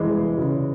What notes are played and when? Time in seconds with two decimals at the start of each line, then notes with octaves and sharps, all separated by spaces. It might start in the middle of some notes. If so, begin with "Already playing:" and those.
Already playing: E3 G#3
0.37 C#3